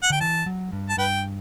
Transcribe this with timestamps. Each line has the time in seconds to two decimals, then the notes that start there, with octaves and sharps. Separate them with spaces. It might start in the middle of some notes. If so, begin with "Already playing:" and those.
0.03 F#5
0.10 D3 G5
0.21 E3 A5
0.46 F#3
0.72 G2
0.89 A5
0.97 G2 B4 G5